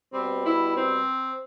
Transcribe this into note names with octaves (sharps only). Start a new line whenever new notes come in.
B2 G3 C4
E4
C4